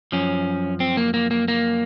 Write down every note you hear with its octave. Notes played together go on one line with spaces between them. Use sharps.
F#2 F3 C#4
C4
A#3
A#3
A#3
A#3